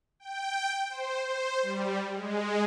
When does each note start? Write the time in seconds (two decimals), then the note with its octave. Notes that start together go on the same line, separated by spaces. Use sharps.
0.20 G5
0.89 C5
1.25 C5
1.63 G3
2.14 G#3